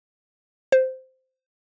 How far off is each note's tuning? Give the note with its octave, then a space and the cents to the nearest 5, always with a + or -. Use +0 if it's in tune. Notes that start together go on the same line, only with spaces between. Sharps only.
C5 -10